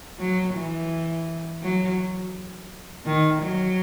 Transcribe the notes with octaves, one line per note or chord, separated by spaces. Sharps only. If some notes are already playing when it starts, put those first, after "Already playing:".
F#3
E3
F#3
D#3
F#3